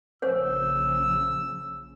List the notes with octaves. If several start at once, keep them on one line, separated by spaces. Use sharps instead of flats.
A#1 C#3 F3 C5 C#5 E6